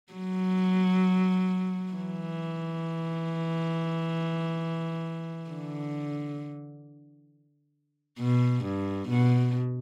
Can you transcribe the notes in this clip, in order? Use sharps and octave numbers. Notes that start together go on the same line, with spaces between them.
F#3
E3
D3
B2
G2
B2